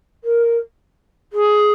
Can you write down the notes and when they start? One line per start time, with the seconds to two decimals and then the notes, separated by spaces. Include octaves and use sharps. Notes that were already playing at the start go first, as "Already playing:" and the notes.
0.24 A#4
1.32 G#4